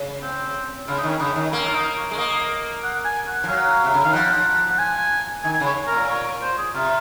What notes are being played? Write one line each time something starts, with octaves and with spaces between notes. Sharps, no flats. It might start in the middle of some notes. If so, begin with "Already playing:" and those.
Already playing: C#3
C4
C#3 F4
D#4
D#3
C#4
C#3 D#4
D#3
A#3 C#4
F4
D#4
C#5
G#3
A#3 D#5
F#5
G#5
F#5
F3
F#3 F5
C3
C#3
D#3 F5
F3 F#5
F#5
G#5
D#3 G#5
C#3
C#5
A#4
A#2
C#5
C5
G#4
C3 F4